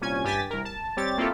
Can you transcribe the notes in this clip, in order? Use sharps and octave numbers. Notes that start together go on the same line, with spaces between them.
C2 A#2 C#4 G#5 G#6
G2 G4 G#5 A6 B6
C2 A#4
A5
G3 C4 G4 C#5 A6
A#3 C4 E4 F4 G4 A4